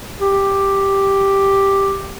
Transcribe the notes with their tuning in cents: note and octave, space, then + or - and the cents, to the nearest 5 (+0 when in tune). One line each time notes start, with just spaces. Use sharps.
G4 +0